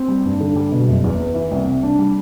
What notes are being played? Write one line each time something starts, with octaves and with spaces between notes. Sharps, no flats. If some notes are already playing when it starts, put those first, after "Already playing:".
Already playing: C4
G3
G2
D3
G3
B2
F#1
E2
B3
E3
C2
C3
D4
G3